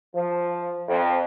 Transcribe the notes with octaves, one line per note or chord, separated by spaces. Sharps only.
F3
F2